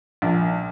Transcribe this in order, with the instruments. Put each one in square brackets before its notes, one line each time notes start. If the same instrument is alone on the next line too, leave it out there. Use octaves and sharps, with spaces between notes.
[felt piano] A#1